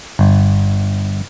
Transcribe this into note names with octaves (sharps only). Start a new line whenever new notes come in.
G1